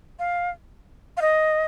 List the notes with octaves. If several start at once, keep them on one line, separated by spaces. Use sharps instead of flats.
F5
F5
D#5